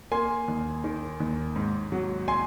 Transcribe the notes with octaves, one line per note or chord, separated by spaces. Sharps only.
A#3 G#5 C6
D#2
D#3
D#2
G#2
F#3
G#5 C6